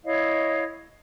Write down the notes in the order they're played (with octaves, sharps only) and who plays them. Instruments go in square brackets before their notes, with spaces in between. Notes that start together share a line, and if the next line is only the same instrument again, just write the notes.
[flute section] E4 C#5 D#5 F5